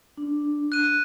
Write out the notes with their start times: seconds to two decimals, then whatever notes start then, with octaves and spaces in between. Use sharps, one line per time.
0.17 D4
0.72 F#6 D#7